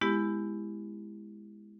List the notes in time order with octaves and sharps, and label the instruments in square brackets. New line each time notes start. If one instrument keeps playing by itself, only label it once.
[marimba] G#3 B3 E4 G4